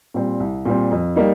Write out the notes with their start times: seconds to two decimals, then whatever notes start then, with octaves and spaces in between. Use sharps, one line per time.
0.14 A#2 G3 C4
0.40 C2
0.65 A#2 G3 C4
0.91 F2
1.16 G3 A#3 D#4